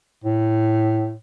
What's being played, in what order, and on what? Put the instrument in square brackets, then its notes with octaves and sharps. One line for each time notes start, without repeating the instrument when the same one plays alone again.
[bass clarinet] A2